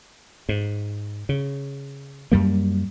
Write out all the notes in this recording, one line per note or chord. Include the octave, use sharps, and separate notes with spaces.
G#2
C#3
F#2 G3 A#3